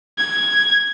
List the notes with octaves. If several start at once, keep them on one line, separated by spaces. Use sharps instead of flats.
G#6